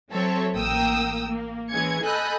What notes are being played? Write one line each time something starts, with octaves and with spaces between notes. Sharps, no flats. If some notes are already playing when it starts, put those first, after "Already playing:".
F#3 C4 A4 C#5 E5
A1 A#3 A#4 G5 D#6 E6
A#3
E3 G#3 C#4 G#4 G#6 C#7
A4 D#5 G#5 B5 F#6 G6